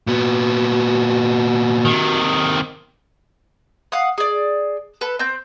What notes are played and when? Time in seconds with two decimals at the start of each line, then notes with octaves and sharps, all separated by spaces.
0.07 A#2 B3 F#4
1.85 C3 D#3
3.92 F5 F#5 D#6
4.18 G#4 D5
5.01 A4 B4
5.19 C4 G6